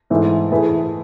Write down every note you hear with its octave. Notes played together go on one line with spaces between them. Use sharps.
G#2 E3 A3 E4
E3 A3 E4 G#4 B4